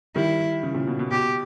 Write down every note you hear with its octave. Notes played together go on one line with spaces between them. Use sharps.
D#3 G3 E4
C#3 E3
A#2 C#3
B2
B2
B2 G4